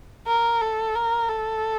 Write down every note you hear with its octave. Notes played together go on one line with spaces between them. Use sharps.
A#4
A4
A#4
A4